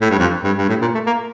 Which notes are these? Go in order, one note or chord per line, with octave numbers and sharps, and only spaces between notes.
A2
G2
F2
G2
G2
A2
A#2
A3
A#3